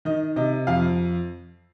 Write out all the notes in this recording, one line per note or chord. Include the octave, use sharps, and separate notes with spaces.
D#3 D#5
C3 D#5
F2 F5